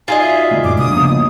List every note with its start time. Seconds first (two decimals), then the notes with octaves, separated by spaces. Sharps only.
0.08 D#4 F4 F#4 G#4 D5 D#5 G#5
0.21 E5
0.51 D3 G#3 A3
0.64 F#2 A#2 D6
0.78 C2 C3 G3 A3 D4 D#6
0.91 C#3 F3 A#3 B3